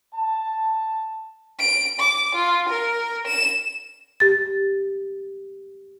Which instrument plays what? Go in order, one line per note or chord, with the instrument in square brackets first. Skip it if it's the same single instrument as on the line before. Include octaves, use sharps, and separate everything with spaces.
[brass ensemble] A5
[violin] D7
D6
F4
A#4
E7
[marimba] G4 A6